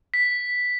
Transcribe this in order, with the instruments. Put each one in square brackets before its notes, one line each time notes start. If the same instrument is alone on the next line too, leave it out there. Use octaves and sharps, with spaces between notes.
[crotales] B6